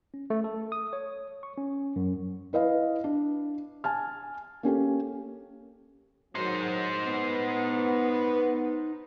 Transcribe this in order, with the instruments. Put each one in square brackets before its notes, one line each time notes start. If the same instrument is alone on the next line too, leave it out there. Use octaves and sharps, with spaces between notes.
[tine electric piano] C#4
A3
A4
D#6
C#5
C#6
C#4
F#2
[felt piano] E4 B4 D#5 F5
D4
G#5 A5 F6
A#3 C#4 G4 A4
[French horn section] G#2 D#3 F#3 [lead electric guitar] D#4 C5
[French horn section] B3